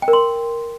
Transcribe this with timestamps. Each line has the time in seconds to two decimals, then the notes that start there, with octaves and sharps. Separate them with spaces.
0.02 G5
0.08 A#4
0.13 C6